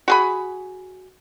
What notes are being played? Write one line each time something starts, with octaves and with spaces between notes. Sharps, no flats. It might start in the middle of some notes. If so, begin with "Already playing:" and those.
F#4 G#4 B5